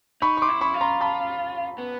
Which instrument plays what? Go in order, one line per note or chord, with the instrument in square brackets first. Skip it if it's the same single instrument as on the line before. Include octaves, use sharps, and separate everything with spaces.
[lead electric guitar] D#4 [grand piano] B5 C#6
[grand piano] C#6
C6 D6
[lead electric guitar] E4
[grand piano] B5 C#6
[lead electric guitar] F4
[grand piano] A#5 C6
A5 B5
[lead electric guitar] B3